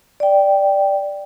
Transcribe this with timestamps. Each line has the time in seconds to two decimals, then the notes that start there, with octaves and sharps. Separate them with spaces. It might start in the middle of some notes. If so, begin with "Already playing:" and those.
0.20 D5 G5